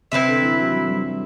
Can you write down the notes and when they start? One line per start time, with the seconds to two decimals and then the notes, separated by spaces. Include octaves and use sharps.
0.12 C3 C4 E4 B4 E5
0.28 D3
0.42 E3
0.57 F#3
0.72 G3
0.88 G3
1.03 F#3